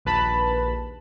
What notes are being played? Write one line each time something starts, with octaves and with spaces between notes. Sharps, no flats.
A#1 D#2 B4 A5 B5